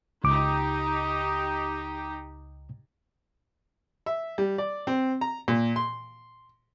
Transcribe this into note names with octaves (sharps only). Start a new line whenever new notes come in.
C#2 D#4 G4 D6
E5
G3
D5
C4
A#5
A#2
C6